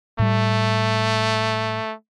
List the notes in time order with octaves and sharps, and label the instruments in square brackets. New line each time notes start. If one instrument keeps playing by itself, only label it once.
[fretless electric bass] A2 G3 [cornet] A3